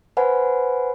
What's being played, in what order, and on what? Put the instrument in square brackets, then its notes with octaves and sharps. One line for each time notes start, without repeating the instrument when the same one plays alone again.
[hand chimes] B4 C5 F#5 G#5 B5